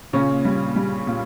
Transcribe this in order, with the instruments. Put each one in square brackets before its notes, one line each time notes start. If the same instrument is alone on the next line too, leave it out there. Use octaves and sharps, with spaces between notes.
[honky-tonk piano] A#2 [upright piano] C#3 C#4
[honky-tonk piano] G3
G3
A#2